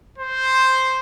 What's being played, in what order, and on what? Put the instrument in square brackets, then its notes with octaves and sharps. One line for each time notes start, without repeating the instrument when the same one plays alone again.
[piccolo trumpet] C5